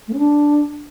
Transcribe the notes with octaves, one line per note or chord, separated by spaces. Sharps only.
A3
C#4
D4